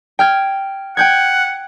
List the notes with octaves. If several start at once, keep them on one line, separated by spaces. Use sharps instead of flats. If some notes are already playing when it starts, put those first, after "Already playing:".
G5 F6 G#6
F#5 G5 G6 G#6